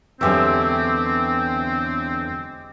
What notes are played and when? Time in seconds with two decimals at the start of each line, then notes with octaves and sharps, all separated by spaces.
0.21 E2 D3 F#3 G#3 C4 G4 E5